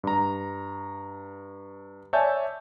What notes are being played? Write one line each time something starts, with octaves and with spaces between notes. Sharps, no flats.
G2 A#5
C#5 D5 E5 G#5 A5 G6